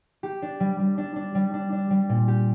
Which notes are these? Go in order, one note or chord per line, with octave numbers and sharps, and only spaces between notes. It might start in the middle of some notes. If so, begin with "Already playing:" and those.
G4
D4
G3
G3
D4
D4
G3
D4
D4
G3
A#2
G4